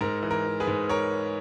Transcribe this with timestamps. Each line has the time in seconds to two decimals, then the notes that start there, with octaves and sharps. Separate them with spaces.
0.01 G#2 A#4
0.23 E3
0.31 A#4
0.46 E3
0.60 G#4 B4
0.67 G#2
0.89 A#4 C#5